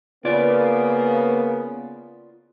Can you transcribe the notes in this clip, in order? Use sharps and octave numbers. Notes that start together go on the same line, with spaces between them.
C#3 A#3 B3 F4 C#5 D5